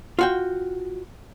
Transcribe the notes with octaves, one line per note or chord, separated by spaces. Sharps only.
F4 F#4 G5